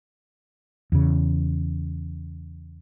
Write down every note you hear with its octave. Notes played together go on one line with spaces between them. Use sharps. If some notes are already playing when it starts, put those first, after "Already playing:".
E2 C#3